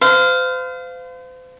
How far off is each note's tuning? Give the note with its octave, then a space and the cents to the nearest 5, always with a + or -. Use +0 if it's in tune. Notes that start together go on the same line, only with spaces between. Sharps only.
C5 -40 F5 +0